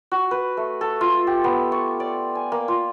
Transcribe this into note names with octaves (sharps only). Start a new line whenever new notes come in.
F#4
B4
A3
A4
F4
G4
B3
C#6
D5
G#5
A#3
F4